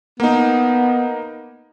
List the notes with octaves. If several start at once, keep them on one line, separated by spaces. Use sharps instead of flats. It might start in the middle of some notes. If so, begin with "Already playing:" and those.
A#3 B3 D#4